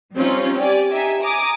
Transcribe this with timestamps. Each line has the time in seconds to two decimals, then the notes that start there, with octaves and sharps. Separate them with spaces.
0.14 G3 C4 C#4 D#4 F4
0.56 G4 D5 G#5
0.91 D#4 G4 E5 G#5
1.21 G#5 A#5 D6 D#6